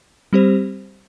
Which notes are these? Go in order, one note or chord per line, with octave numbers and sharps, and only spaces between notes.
G3 C4 G4 C5